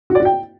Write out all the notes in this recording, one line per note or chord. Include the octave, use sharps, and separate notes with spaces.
F#4
D5
F#4
G5